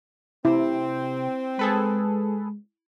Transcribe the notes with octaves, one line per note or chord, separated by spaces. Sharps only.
C3 C4 E4
G#3 G#4 A4 B4